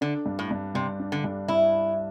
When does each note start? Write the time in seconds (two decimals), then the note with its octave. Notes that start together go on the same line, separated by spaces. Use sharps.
0.01 D3 D4
0.26 G2
0.39 A2
0.51 G2
0.75 G2 C3
1.00 D4
1.12 D3
1.24 G2
1.48 G2 E4